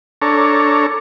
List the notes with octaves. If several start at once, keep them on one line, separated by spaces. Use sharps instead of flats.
D4 A4 C#5 A#5